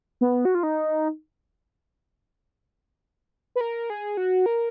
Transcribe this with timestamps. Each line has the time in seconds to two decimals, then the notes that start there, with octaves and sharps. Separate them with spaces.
0.21 B3
0.45 F#4
0.55 F4
0.63 D#4
3.56 B4
3.61 A#4
3.90 G#4
4.17 F#4
4.46 A#4